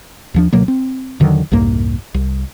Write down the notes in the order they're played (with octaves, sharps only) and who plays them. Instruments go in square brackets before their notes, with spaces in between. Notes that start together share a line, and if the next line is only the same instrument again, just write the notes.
[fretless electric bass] D#2 F3 D4
D2 B2 F#3 A#3
C4
E2 D3 D#3 F#3
C2 F2 G#2 A#3
C2